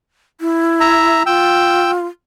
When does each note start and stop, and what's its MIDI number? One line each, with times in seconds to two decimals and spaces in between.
0.41 1.23 64
0.80 1.23 76
0.80 1.23 82
1.26 2.06 65
1.26 1.91 79
1.26 1.91 88